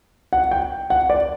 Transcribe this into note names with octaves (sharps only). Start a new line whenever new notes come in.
F#5
G5
F#5
D5